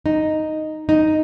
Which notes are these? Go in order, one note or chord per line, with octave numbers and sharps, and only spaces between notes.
D#4
D#4